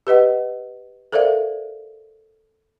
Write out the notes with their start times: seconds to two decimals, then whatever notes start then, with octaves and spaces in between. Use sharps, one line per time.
0.07 G4 B4 D#5 F#5
1.12 A4 A#4 C5 D5 E5 F5